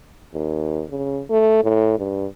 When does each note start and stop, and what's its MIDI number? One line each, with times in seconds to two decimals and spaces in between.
0.33 0.84 39
0.89 1.22 49
1.30 1.59 57
1.63 1.96 45
1.98 2.26 43